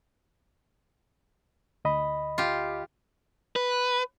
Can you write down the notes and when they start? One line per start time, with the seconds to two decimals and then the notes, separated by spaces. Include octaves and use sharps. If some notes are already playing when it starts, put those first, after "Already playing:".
1.85 D2 D#5 B5
2.38 F4 G4
3.56 B4